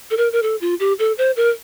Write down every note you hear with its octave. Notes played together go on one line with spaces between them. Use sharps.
A4
A#4
A#4
A4
F4
G4
A4
C5
A#4